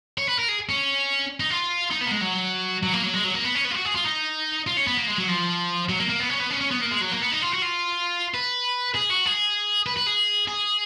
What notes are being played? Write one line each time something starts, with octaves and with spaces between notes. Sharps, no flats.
C#5
B4
A#4
G#4
C#4
D#4
F4
D#4
B3
A#3
G#3
F#3
F#3
A#3
F#3
G#3
F#3
A#3
B3
C#4
B3
F4
F#4
G#4
F4
D#4
F4
C#4
B3
A#3
G#3
F#3
F3
F#3
A#3
A#3
B3
C#4
B3
C#4
C#4
B3
A#3
G#3
F#3
A#3
B3
D#4
F4
F#4
F4
B4
G#4
F#4
G#4
B4
B4
G#4
G#4